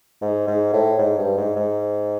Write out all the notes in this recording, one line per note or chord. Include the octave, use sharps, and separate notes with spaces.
G#2
G#2
A2
G#2
G2
G#2
G#2